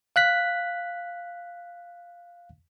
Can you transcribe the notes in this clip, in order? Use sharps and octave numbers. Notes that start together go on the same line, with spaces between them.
F5 F#6 B6